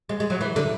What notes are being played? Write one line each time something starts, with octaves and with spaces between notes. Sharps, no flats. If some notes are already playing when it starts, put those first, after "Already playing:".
G#3
G#3
F#3
E3
D3